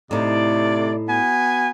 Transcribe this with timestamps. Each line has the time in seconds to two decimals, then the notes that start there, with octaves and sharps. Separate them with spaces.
0.11 A2 C3 A3 D#4 D5
1.09 B3 F#4 G#5